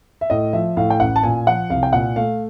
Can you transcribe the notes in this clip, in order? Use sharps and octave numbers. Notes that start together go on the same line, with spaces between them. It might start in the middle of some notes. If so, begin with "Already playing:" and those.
E5
A2 D#5
F3 E5
A2 F5
G5
A1 F#5
A5
A#2 G#5
F3 F#5
C2 F5
G5
A#2 F#5
A3 F5